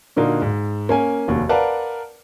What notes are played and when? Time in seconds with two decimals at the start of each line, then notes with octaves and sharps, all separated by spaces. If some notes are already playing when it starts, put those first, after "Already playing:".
0.16 A#2 D3 A#3 D#4 F#4
0.42 G#2
0.89 A#3 C#4 G#5
1.28 F1 D#2 F#4
1.49 A#4 B4 D5 F5 F#5 A5